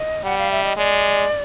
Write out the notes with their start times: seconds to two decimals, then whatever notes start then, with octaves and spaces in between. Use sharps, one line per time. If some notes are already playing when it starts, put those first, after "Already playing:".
Already playing: D#5
0.24 G3 F#5
0.38 F5
0.51 E5
0.64 D#5
0.77 G#3 D5